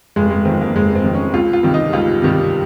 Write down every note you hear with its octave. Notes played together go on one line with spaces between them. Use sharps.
F1 G#3
G#3
F2 D#3 C4
A#3
F1 G#3
C4
F2 D#3
C#4
C#2 F4
F4
C3 D#3 G3
D#4
C#2 F4
C3 D#3 G3